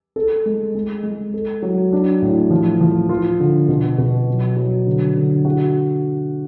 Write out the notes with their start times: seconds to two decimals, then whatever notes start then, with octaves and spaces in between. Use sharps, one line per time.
0.16 A4
0.46 G#3
0.75 G#3
1.03 G#3
1.34 A4
1.62 F#3
1.93 D4
2.22 A2
2.50 F3
2.81 F3
3.09 F4
3.40 D3
3.68 B2
3.98 B2
4.28 F#3
4.56 F#3
4.87 D3
5.17 D3
5.45 F#4